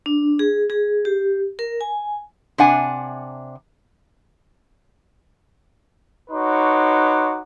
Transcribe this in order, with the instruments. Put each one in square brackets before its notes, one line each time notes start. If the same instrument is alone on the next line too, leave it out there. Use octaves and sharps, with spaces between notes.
[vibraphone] D4
G#4
G#4
G4
A#4
G#5
[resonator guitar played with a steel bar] C3 D4 F#5 G#5
[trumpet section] D#4 F#4 B4 C#5 C6 D6